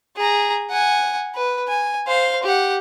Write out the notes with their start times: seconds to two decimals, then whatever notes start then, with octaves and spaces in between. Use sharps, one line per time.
0.17 G#4 A#5
0.70 F#5 G#5
1.35 B4
1.68 G#5
2.07 C5 F5
2.43 G4 F#5